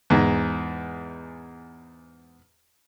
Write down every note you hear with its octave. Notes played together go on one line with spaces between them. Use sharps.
E2 G#2